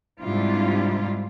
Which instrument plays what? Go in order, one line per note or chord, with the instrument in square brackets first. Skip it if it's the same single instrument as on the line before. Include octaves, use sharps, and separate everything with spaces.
[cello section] G#2 C3 G3 D4 E4 F4